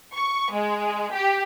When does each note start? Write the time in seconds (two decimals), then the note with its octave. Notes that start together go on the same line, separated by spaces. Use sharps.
0.13 C#6
0.53 G#3
1.13 G4